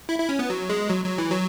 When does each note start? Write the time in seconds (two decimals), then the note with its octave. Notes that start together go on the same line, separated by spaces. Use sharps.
0.09 E4
0.19 E4
0.29 C#4
0.39 B3
0.50 F#3
0.70 G#3
0.90 F#3
1.04 F#3
1.18 E3
1.31 F#3